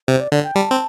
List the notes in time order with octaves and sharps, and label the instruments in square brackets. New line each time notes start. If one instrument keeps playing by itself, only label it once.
[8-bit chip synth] C3 [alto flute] C5
[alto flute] D5
[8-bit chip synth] D3 [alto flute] D5
[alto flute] G5
[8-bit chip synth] G3 [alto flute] A5
[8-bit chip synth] C4